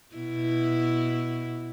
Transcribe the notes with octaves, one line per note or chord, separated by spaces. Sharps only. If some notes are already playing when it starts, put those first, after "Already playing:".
B2 E4